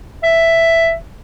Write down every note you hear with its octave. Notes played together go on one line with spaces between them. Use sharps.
E5